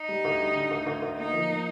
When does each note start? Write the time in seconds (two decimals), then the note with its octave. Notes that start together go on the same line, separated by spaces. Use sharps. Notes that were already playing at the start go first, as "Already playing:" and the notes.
Already playing: D#4
0.09 G3
0.25 D2
0.40 G3
0.55 D3
0.71 D2
0.87 D2
1.02 D2
1.18 A#3 D#4
1.33 F3
1.49 A#3